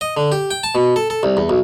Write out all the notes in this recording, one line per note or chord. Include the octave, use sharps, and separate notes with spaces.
D#5
D3
G4
G5
A5
B2
A4
A4
C2
E2
B1